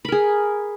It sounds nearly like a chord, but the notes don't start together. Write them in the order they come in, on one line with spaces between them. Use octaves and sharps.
B5 A#4 G#4